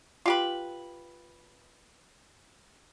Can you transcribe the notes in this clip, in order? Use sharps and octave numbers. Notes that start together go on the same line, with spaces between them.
F4 G4 B4